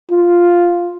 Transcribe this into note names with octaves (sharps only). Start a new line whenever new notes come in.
F4